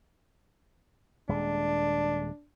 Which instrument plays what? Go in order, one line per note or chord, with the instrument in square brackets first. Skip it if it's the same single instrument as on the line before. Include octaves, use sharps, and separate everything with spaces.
[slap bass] D#1 G#3 [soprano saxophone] D4